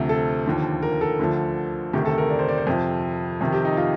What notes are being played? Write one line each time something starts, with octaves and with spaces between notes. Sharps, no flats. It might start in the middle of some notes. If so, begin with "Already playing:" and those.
Already playing: D2 C3 F3
A4
D#2 D3 F3
A#4
A4
D2 D3 F3
D2 C3 D#3 G4
A4
A#4
D5
C5
D5
C5
F2 C3 F3
F2 C3 D#3
G4
D#4
F4